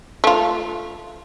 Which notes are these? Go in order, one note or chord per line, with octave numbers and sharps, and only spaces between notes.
A3 F4